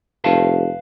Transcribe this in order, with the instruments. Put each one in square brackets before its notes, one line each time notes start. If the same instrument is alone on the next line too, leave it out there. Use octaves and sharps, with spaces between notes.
[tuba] F1 [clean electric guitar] B4 F5 A5